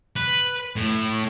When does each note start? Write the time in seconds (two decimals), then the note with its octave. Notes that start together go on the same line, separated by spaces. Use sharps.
0.16 B4
0.76 A2